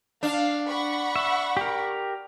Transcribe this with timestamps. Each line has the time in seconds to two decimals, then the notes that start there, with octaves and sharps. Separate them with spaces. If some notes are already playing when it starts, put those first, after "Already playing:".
0.23 D4 F5
0.66 F#5 B5 C#6
1.16 E5
1.57 G4 A#4